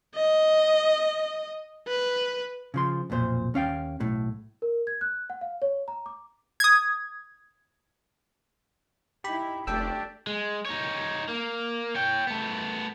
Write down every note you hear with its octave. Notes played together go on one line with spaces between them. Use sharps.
D#5
B4
C#3 F3 C6
B1 F2 A#2 C5
D#2 C#4 F5 G5
B1 A2
A#4
G#6
F#6
F#5
F5
C#5
A#5
D6
D#6 G#6
D#4 E4 G4 B5
F1 A3 D4 G4 A4 G5 E6
G#3
D#4 C#5
A#3
C#5 G5
A3 B3